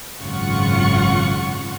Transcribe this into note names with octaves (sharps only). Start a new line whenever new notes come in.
G#1 F#2 C#3 F4 F#5 C#6